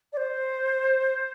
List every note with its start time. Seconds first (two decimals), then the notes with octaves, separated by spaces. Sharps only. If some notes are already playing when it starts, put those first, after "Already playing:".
0.12 D5
0.17 C5